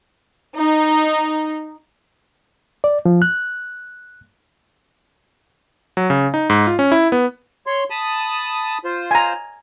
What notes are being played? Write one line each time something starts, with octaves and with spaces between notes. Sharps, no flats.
D#4
D5
F3
F#6
F#3
C#3
D#4
G#2
F4
C#4
E4
B3
C#5 C6
A5 B5 D#6
F4 C5
G#5 A#5